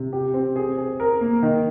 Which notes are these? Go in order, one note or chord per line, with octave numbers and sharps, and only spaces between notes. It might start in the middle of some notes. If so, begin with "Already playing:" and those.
Already playing: C3
G4
C4
G#4
G#4
A#4
A#3
D#3